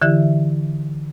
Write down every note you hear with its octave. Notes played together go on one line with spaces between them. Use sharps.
D3 E3 E4 G4 E5